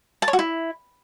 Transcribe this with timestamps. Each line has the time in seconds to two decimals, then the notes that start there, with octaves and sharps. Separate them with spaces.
0.22 A5
0.28 C#5
0.33 F#4
0.39 E4